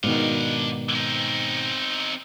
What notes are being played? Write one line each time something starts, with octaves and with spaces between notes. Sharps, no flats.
G#2 B2 D#3 D4 F5
C4 D#4